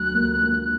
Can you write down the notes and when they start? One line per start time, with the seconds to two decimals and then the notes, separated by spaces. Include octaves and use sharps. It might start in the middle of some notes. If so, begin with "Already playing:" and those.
Already playing: D2 F#3 F#6
0.15 A#3
0.43 A#3